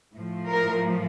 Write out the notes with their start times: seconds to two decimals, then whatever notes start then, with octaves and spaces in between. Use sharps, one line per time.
0.15 A2 F3
0.49 A#4